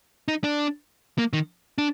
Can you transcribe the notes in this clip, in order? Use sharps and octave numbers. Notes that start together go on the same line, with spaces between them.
D#4
D4
A#3
D#3
D4